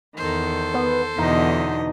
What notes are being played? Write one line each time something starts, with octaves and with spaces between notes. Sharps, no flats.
E2 D#3 A4 C5
B3
E2 B2 D3 D#4 D#5